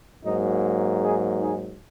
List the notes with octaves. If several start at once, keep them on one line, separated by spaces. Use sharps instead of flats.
G#2 F#3 A#3 D#4
D#4 G#4
D#4 G#4